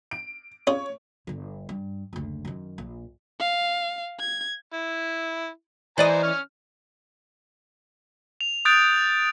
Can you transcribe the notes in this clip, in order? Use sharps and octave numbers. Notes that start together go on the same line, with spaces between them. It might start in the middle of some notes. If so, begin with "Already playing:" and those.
D7
C#4 F4 G#4 C#5
G1 D3
G2
F#1 D2
F#2 D#3
A#1
F5
G#6
E4
E3 C5 D5 D#5 G#5 A#5
C#4 F6
F7
D#6 F#6 G6 A6 D7 F7